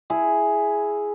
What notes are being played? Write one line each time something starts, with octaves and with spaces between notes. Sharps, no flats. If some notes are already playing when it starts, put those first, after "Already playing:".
E4 G#4